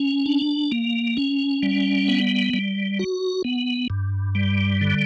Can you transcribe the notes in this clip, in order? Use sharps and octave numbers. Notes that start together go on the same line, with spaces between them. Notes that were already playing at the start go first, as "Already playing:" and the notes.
Already playing: C#4
D4
A#3
C#4
G3
B3
G3
F#4
B3
G2
G3
D3